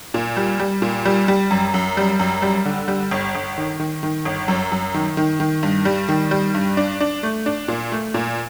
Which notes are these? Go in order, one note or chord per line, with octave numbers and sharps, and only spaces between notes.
A#2
G3
G3
A#2
G3
G3
F#2
F#2
G3
F#2
G3
D3
G3
G1
G1
D#3
D#3
D#3
G1
F#2
F#2
D#3
D#3
D#3
G2
G3
D#3
G3
G2
D4
D4
A3
D4
A#2
A3
A#2